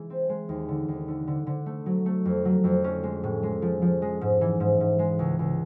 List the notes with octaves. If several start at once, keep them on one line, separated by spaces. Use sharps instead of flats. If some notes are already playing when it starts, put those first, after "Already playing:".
Already playing: E3 G#3
C4
G#3
D#2
D3
D#2
D3
D3
D3
A3
F#3
A3
F2
F#3
F2
C#4
G#3
A2
G#3
F3
F3
G#3
G#2
E3
G#2
G#2
G#3
C#2
C#2